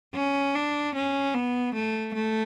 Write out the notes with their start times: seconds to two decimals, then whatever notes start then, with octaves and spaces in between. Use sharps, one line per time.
0.15 C#4
0.55 D4
0.95 C#4
1.34 B3
1.75 A3
2.14 A3